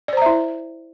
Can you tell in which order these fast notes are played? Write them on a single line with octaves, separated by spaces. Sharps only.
D5 C5 A#5 E5 E4